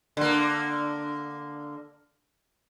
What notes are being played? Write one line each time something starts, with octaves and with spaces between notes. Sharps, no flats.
D3 A#3